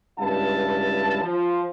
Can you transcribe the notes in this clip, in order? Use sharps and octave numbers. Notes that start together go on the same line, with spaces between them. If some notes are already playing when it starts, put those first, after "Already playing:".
C#2 G2 E4 F5 A5
F3